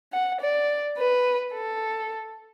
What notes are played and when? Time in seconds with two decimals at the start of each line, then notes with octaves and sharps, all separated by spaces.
0.13 F#5
0.41 D5
0.98 B4
1.53 A4